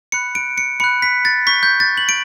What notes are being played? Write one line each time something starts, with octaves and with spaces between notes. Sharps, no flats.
B5 F#6 C#7
D7
C#7
B5 F#6 C#7
B6
A6
C#6 G6 B6
G6
A6
F#7
D7